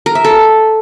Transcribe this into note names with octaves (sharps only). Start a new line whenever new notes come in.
A#4
E5
A4